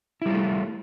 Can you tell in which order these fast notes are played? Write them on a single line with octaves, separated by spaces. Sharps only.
E4 G3 F4 A3